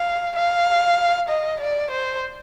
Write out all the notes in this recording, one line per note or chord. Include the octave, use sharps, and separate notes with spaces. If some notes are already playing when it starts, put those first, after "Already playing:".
Already playing: F5
F5
D#5
D5
C5